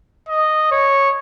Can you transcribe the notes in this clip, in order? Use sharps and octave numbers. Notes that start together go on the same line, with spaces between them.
D#5
C#5